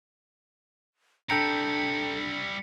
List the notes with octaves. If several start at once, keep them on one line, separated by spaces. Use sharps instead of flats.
G3 D4 E4 A4 G5 A#5 C#7